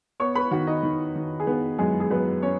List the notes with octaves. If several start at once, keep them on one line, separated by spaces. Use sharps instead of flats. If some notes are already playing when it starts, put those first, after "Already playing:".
B3 C#5 C#6
B4 B5
D#3 F#4 F#5
D#4 D#5
D#3
D#3
G#4
D#3 B3 B4
F#2 G#3 G#4
G#4
F#2 B3 B4
C#4 C#5